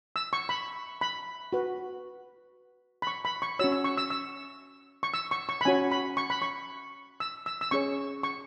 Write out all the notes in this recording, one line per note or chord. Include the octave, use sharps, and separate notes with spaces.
E6
C#6
B5
B5
F#4 B4
B5
C#6
B5
C#6
C#4 F#4 C#5 E6
E6
C#6
E6
E6
C#6
E6
C#6
C#6
B5
C#4 F#4 C#5 G#5
B5
C#6
B5
C#6
E6
E6
E6
C#4 G#4 C#5 C#6
C#6